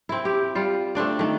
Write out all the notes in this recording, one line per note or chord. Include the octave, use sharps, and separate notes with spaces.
C4 E4
G4
G3 F4
A3 C4 D4 D5
D#3 A3